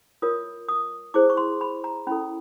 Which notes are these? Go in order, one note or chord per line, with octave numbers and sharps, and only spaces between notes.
F4 A#4 C#5 D#6
D#6
E4 G#4 C5 D6
C#6
C6
B5
A#5
C#4 E4 A4 B5